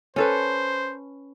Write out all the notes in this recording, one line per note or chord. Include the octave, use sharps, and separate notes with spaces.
C#4 A4 B4 C5